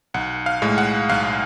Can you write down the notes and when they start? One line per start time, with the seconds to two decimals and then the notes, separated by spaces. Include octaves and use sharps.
0.14 B1 F#5
0.46 F5
0.62 A2 G#3
0.78 F#5
1.09 B1 F5